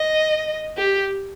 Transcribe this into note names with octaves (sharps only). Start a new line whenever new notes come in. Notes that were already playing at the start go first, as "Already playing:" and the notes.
Already playing: D#5
G4